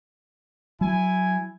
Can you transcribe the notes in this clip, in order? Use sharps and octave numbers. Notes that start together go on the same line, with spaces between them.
F#3 E4 G#5